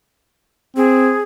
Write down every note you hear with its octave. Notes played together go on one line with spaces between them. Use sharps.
C4 G#4